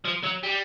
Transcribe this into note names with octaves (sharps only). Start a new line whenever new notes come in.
F3
F#3
G3